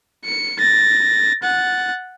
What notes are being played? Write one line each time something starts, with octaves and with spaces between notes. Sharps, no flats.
C#7
A6 A#6
F#5 A6